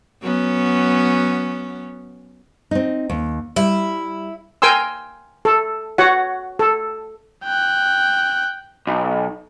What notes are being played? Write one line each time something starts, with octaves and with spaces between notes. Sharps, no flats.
F#3 B3 C#4
C4 D#4
D#2
G3 E4
A#4 G5 G#5 C6 E6
A4
F#4 C#5 F#5
A4
G5 F#6
B1